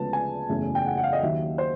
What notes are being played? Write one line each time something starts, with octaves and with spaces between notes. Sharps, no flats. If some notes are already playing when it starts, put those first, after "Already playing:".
Already playing: D2 C#3 F3 G#3 B3 A5
G#5
F#1 E2 C#3 F#3 A3
G5
F#5
F#5
F5
D#5
D#2 D#3 F#3 E5
C5